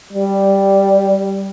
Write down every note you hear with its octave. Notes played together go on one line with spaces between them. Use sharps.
G3